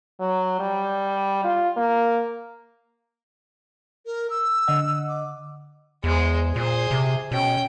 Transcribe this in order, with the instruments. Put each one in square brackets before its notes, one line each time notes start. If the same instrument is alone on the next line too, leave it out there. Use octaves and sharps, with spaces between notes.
[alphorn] F#3
G3
F4
A#3
[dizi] A#4
E6
[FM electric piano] D3 D#5 F#5
[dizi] D6
[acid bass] E2 [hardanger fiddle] G#3 C5
[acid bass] A#2 [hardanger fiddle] G#4 C5
[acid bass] C3
[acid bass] B2 [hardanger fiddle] C#4 G5